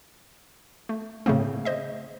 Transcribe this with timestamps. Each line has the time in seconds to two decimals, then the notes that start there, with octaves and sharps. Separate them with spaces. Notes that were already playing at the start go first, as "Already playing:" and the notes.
0.89 A3
1.26 A2 C#3 A3 A#3 C4
1.65 C5 D#5 E5